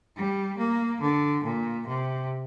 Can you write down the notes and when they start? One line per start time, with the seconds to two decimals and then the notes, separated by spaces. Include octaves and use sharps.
0.17 G3
0.58 A#3
1.01 D3
1.45 A#2
1.88 C3